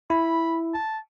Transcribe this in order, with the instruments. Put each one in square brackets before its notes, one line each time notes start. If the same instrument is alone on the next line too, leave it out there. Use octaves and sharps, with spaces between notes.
[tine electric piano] E4 [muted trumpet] B5
[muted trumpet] A5